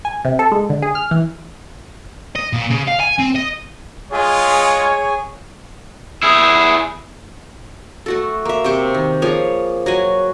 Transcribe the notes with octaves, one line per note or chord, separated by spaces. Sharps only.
G#5
C3
A4
G#3
D3
G#4
F6
E3
D#5
A#2
C#3
F5
G#5
C4
D#5
G#3 F4 G#4 C#5
E4 G#4
A3 F#4 A4
A#3 E5
C3 C5 G5 C#6
D#3
F3 A#3 G#4 C#5
F#3 F#4 G#5